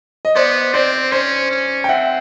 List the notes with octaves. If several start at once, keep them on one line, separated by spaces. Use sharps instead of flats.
D#5
B3 C5 D5
C4 C5 D5
C#4 C5
C#4
G5
C4 E5 F#5